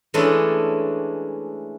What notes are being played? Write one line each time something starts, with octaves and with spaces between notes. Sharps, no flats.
E3 G#3 A3 C#4 D4 A4